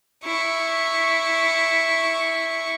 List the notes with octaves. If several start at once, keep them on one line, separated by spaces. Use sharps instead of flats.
E4 C#6